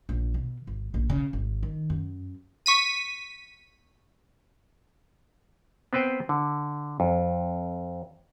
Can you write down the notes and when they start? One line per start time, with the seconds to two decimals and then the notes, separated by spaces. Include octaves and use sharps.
0.09 A#1
0.34 B2
0.67 G#1
0.94 A#1
1.10 C#3
1.33 G#1
1.63 D#3
1.90 F#2
2.66 C#6 B6 D#7
5.93 B3 C4 B4 C5 G5
6.29 D3
7.00 F2